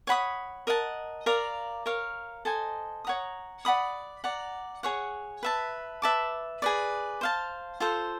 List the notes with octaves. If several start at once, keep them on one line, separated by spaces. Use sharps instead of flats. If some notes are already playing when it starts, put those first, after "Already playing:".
C#5 F#5 B5 D#6
A#4 D#5 F#5 A5
A#4 D5 F5 A#5
A#4 C#5 F5
A4 C5 D#5 G#5
C#5 F#5 A#5 D#6
D5 F#5 B5 D#6
D5 F#5 A#5
G#4 C#5 F#5
B4 E5 A5
B4 E5 A5 D6
G#4 B4 D5
C5 F5 A5
F4 A4 C5